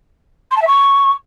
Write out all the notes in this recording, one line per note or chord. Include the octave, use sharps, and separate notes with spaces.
C6
A5
E5
C#6